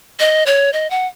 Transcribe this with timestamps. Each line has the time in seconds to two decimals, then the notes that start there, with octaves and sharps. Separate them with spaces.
0.20 D#5
0.46 C#5
0.73 D#5
0.90 F#5